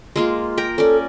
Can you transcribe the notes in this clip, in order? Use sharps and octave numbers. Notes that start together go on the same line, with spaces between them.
G#3 A#3 F4
A#4 G5
C#4 A4 D5